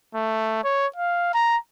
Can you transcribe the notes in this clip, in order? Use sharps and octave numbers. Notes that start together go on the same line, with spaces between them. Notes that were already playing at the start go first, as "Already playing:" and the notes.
A3
C#5
F5
A#5